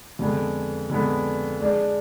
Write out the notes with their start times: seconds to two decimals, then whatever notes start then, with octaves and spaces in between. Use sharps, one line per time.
0.19 F2 D3 G#3 B3
0.90 F2 D3 G#3 B3
1.61 G#3 D4 G#4